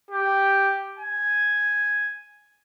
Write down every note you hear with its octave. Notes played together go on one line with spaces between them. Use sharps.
G4
G#5